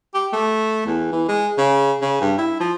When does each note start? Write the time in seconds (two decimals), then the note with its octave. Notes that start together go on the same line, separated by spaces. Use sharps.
0.14 G4
0.33 A3
0.86 E2
1.12 E3
1.28 G#3
1.58 C#3
2.02 C#3
2.21 G2
2.38 E4
2.60 F3